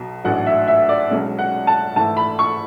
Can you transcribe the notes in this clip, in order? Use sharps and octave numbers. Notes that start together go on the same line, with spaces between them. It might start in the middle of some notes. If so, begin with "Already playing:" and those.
Already playing: B1 B2 F#3
A1 G#2 F#3 A3 D4 F#5
E5
E5
D5
B1 B2 G#3 C#4
F#5
A5
G#2 E3 A3 E4 A5
B5
C#6